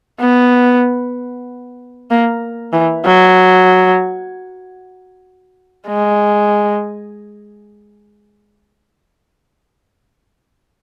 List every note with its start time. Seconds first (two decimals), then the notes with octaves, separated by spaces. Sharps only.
0.20 B3
2.10 A#3
2.73 E3
3.05 F#3
5.88 G#3